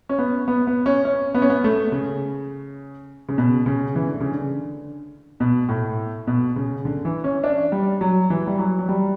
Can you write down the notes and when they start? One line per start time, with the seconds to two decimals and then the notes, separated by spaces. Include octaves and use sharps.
0.09 C#4
0.18 B3
0.48 B3
0.67 B3
0.86 C#4
1.05 C#4
1.34 B3
1.42 C#4
1.50 B3
1.64 A3
1.92 C#3
3.29 C#3
3.38 B2
3.66 C#3
3.95 E3
4.07 D3
4.20 C#3
4.32 D3
5.40 B2
5.69 A2
6.27 B2
6.56 C#3
6.85 D3
7.05 E3
7.24 C#4
7.44 D4
7.72 G3
8.01 F#3
8.30 E3
8.47 G3
8.59 F#3
8.79 F#3
8.89 G3